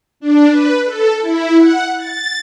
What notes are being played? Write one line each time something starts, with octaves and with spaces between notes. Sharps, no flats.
D4
B4
A4
E4
F#5
A6